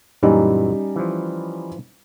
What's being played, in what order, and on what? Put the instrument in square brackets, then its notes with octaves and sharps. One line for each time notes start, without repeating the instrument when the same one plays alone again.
[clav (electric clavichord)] F#2 A#2 E3 [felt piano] G3 C#4 D#4
[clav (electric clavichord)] E3 F3